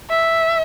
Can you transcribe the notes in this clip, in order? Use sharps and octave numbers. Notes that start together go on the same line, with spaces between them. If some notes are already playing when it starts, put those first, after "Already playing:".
E5